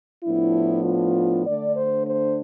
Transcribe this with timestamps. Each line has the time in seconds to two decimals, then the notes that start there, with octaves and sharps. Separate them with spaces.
0.24 A2 F3 B3 D4 E4
0.85 F4
1.46 D3 A3 D4 D5
1.75 C5
2.06 C5